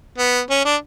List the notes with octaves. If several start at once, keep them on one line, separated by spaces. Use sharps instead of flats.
B3
C#4
D4